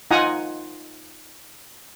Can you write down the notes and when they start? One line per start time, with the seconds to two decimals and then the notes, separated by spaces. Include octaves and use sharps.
0.11 D#4 F4 F#5 G#5 A#5 D#6